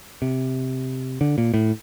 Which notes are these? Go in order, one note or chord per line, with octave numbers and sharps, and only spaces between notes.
C3
D3
A#2
A2